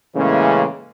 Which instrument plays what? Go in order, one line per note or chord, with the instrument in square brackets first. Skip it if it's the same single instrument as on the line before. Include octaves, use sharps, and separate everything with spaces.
[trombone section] A2 C#3 E3 G#3 A#3 C#4